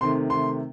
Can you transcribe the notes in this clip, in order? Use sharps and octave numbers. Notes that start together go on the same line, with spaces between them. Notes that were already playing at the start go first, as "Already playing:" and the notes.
C3 D#3 A3 C6
C3 D#3 A3 C6